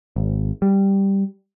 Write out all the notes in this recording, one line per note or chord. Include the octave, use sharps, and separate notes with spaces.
G#1
G3